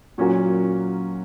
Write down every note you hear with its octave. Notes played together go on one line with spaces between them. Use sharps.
A#2 F#3 C#4 F#4 A#4